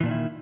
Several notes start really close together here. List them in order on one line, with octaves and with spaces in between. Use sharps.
E3 A#2 D4 D#3 E4